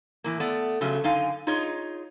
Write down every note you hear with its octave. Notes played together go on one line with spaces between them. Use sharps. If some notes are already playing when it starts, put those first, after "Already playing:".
A2 E3 A#3
A3 B3 D5
C#3 F3 F#3 A3
F#2 D3 D#4 F5 G#5
D#4 F4 G#4 C#5 D#5